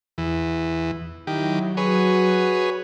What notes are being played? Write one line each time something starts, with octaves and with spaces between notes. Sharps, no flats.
E2 E3
D#3 F#3 E4 G4
F#4 G#4 B4 C#5